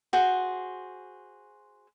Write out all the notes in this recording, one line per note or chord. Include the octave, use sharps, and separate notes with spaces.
F#4 G#4 C5